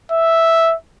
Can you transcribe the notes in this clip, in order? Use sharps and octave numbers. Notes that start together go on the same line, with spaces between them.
E5